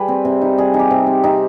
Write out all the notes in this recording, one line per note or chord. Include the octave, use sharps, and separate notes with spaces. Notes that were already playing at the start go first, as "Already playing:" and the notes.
Already playing: G3 G#4 B4
C4
C3
D#4
G3 G#4
D#4
G4
C3
C4
C4 D#4